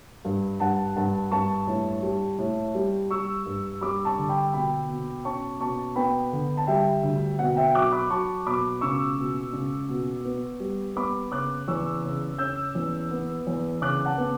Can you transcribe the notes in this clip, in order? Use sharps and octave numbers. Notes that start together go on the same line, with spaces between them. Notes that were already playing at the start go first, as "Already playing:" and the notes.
G2
G2 F#5 A5
G2 F#5 A5
G2 A5 C#6
A2
G3
A2
G3
G3 C#6 E6
G2
G3 B5 D6
A5 C#6
D3
G5 B5
B2 G5 B5
B2
C#4 A5 C#6
B2 A5 C#6
B3 G5 B5
D3
A5
G3 E5 G5
D2
B2 F#5
E5 G5
F#3 D6 F#6
B5 D6
F#3 A5 C#6
B2 B5 D6
C#2 C#6 E6
B2
C#2
B2
B3
G3
B3 B5 D6
C#3 D6 F#6
E2 C#6 E6
C#3
C#4 E6 G6
E2
B3
E2
C#3 D6 F#6
F#5 A5
B3